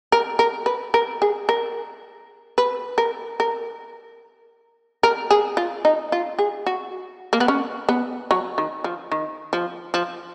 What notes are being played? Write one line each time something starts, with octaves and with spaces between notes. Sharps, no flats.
A#4
A#4
B4
A#4
G#4
A#4
B4
A#4
A#4
A#4
G#4
F4
D#4
F4
G#4
F#4
A#3
B3
C#4
B3
F#3
D#3
F3
D#3
F3
F3